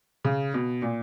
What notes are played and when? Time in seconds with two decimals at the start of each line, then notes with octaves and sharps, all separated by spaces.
0.24 C#3
0.54 B2
0.82 A#2